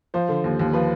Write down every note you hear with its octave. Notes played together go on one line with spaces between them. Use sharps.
F3 C5
D3
D#2
D#2
F3 B4